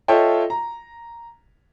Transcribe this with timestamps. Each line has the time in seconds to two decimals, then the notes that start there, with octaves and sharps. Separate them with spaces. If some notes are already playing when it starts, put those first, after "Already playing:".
0.08 F4 A4 C#5 D#5 E5 G5
0.50 A#5